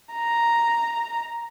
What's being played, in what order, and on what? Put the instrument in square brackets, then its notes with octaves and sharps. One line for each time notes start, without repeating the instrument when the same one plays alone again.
[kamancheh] A#5